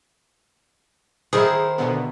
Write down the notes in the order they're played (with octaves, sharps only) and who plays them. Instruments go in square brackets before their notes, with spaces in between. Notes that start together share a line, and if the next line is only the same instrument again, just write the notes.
[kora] D#3 D#4 E4 [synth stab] G#4 [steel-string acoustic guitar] A#4 C5
[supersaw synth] B2 D3 B3